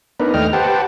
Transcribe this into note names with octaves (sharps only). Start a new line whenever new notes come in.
B3 D4 D#4 A#4 B4
D#2 A3 D#5 G5 F6
G4 B4 C5 F#5 G5 A5